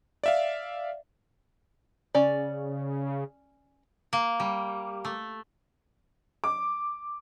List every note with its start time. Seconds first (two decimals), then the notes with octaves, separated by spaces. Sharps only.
0.23 D5 E5 F5
2.15 C#3 C#4 D5
4.13 A#3
4.40 G3
5.05 A3
6.44 D6